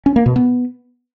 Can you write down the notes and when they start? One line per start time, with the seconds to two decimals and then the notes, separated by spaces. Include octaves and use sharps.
0.06 C#4
0.16 A#3
0.26 B2
0.36 B3